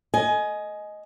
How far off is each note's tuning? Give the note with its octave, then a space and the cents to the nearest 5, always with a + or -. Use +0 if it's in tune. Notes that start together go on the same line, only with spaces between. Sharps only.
D#5 +0 G#5 +20